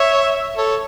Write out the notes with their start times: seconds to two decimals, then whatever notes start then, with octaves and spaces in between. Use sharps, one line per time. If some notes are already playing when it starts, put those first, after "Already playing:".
Already playing: C#5 E5
0.57 A4 C#5